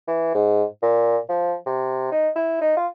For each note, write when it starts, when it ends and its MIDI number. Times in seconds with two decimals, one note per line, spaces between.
0.08 0.31 52
0.35 0.64 44
0.83 1.18 46
1.29 1.55 53
1.66 2.09 48
2.12 2.29 63
2.36 2.59 64
2.62 2.77 63
2.77 2.87 65